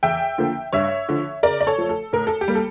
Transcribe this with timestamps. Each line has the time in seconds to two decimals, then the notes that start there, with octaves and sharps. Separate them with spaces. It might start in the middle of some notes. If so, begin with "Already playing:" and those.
0.03 E2 E5 G5
0.38 D3 F3 A#3
0.73 G2 C#5 E5
1.09 D3 F3
1.43 C#3 A#4 D5
1.60 D5
1.67 A4 C#5
1.78 F3 A3
1.89 A4
2.13 A2 A#4
2.27 A4
2.41 G4
2.48 G3 A#3
2.55 A4